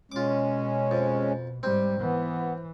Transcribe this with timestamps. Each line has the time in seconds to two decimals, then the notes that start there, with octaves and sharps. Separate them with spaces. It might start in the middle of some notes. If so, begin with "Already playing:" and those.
0.12 B2 G#3 C#4 F4 D6
0.91 F2
1.63 G#2 G3 C4
2.00 E3 B3